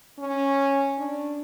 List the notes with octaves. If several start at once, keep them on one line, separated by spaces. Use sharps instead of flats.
C#4
D4